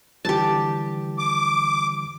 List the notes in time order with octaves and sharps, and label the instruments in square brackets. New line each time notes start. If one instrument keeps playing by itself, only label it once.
[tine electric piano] D3 E3 G3 [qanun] G4 A5
[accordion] D6